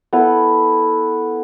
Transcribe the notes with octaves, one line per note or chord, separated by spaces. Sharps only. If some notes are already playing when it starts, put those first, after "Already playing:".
B3 E4 A4